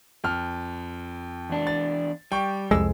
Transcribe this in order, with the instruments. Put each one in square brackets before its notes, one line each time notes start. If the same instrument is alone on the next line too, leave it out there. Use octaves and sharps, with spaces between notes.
[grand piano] F2 F6
[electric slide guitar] E2 D4
[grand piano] A6
[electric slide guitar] G3 [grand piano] G5 C#6
[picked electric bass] C2 F2 G#3 [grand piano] E6